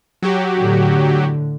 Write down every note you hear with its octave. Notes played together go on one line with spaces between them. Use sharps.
F#3 F#4 G4
A2 D3